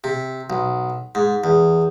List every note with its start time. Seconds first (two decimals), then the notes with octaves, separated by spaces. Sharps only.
0.04 C3
0.50 B1
1.15 G#2
1.44 E2